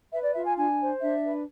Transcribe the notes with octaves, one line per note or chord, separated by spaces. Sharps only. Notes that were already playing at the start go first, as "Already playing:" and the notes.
B4 E5
D5
F4 E5
G#5
D4 G#5
C5
D4 E5
B4